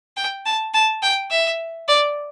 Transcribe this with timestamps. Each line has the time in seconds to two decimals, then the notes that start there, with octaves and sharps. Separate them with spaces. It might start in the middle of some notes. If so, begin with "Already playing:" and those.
0.17 G5
0.45 A5
0.74 A5
1.03 G5
1.31 E5
1.88 D5